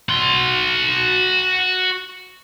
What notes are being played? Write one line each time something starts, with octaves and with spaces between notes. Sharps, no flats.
F#4 C6